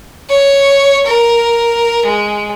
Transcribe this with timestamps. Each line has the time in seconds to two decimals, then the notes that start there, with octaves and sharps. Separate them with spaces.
0.30 C#5
1.07 A#4
2.06 G#3